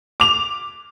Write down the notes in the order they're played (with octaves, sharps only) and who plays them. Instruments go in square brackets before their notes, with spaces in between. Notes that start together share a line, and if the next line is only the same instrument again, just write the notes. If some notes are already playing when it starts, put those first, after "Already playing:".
[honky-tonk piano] D6 F7